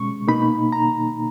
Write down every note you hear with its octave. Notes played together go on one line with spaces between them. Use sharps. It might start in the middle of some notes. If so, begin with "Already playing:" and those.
Already playing: B2 G#3 C#4 C#6
B2 A#3 D#4 B5
A#5